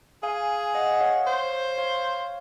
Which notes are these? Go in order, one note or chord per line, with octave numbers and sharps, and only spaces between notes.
G#4 F5 G#5
D#5 F#5
F#5
C#5 F5
C5
C#5 F5